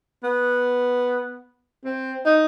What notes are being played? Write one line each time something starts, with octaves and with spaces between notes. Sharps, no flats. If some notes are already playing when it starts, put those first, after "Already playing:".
B3
C4
D#4